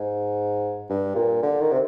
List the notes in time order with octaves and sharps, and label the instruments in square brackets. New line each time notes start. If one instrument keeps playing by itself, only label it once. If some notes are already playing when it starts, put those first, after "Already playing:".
Already playing: [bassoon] G#2
G2
A#2
D3
D#3
C3